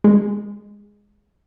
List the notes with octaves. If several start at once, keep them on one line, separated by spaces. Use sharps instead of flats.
G#3